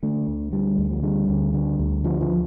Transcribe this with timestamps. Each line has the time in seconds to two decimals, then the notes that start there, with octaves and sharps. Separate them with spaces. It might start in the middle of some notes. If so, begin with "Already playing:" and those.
0.03 D3 A3
0.28 D2
0.53 D3 G3
0.78 D2
0.91 F3
1.03 D3 G3
1.29 D2
1.54 D3
1.79 D2
2.04 D3 F3
2.21 F3